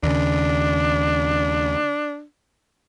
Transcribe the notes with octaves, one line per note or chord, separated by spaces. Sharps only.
D#2 C#3 D4